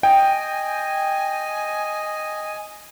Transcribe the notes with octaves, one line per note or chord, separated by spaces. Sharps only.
D#5 G5 G#5